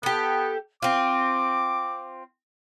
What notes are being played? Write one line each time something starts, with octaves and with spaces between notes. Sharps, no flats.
B3 G4 A4
C4 F4 D6